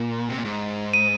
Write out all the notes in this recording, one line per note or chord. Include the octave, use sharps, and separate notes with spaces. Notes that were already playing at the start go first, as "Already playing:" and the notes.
Already playing: A#2
C3
A#2
G#2
D#7